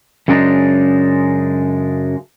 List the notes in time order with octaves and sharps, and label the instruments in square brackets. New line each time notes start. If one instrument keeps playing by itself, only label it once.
[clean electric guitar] F#2 C#3 G#3 D4 D#4